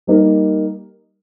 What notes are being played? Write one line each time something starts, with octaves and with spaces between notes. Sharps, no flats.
G3 A#3 D#4 A#4